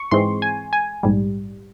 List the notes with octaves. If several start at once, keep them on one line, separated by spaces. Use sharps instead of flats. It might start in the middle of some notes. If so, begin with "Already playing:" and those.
Already playing: C#6
G#2 E3 G#3 C4 C6
G#5
G#5
A#1 G#2 G3